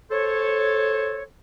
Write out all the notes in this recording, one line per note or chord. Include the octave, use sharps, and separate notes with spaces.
A4 C5 C#5